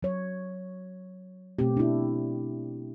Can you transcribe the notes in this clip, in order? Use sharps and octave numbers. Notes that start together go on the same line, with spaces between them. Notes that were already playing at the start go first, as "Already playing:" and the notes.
F#3 C#5
B2 A3 C4 G4
D4 E4